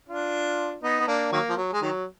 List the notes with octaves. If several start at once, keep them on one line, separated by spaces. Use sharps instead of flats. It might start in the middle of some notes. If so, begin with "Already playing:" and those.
D4 F4
B3 D#4
B3
A#3 D4
D#3 F#3 A#3
F3
F#3
G#3
D#3 F#3